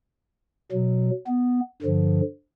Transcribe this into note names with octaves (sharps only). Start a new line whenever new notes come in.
B2 F#3
B3
G2 D3 F3